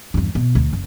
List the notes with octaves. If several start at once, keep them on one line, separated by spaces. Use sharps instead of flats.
E2 G2
B2
D2
F#1